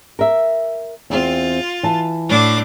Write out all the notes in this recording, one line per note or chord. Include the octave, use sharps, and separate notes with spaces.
A#4 E5
E2 C4 F4
E3 A5
A2 D4 D6